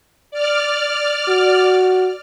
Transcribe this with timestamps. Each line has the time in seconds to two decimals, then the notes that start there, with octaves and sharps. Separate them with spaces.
0.31 D5 F6
1.29 F#4